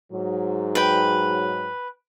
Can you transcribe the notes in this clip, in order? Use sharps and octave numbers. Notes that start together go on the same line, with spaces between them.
G#2 F#3
B4 G5